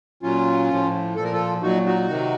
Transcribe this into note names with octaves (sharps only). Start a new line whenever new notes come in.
A#2 F#3 C#4 F4
A2 F3
A#2 F3 A4
A#4
F4 A4
A#2 F#3 D#4 F#4
D#4 F#4
C3 D#3 F#3